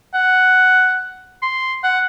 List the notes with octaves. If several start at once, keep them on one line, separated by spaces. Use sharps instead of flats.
F#5
C6
F#5